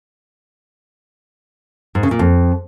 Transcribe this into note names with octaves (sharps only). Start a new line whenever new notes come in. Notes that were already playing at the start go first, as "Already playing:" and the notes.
G#2
C#3
A#2
F2